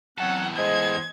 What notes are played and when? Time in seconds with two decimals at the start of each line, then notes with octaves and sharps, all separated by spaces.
0.18 E2 F#3 C4 C#4 A4 F#5
0.57 G#3 C5 D#5 G#6